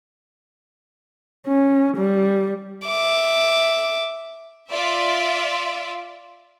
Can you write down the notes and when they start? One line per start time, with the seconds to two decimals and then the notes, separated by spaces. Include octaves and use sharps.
1.47 C#4
1.97 G3
2.86 E5 D6
4.70 F4 D5 E5